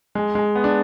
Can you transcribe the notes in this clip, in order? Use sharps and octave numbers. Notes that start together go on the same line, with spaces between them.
G#3
G#3
B3
D4